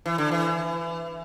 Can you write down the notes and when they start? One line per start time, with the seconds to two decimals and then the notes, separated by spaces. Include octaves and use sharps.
0.06 E3
0.18 D3
0.31 E3